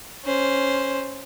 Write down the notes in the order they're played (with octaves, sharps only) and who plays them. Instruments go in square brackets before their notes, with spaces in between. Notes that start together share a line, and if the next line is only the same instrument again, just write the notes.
[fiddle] C#4 C5